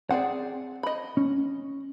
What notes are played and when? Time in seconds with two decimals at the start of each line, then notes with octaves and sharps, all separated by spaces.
0.11 C4 G#4 D5 F#5
0.83 D#5 B5
1.17 C#4